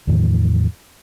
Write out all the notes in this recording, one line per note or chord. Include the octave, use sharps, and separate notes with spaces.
E2 A2 D#3 F3